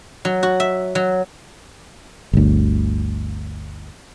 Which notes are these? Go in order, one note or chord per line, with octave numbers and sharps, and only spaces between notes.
F#3
F#4
E5
F#3
G1 D2